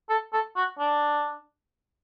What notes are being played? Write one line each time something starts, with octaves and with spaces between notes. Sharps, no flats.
A4
A4
F#4
D4